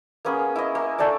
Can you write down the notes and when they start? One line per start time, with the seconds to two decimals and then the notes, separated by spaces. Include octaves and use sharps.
0.25 A#3 B3 C#4 G#4
0.56 E4 D#5
0.75 A#3
0.98 A3 D4 A4 D5